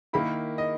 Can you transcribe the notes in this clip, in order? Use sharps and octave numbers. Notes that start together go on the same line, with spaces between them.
D#3 A#3 E4 B5
D#5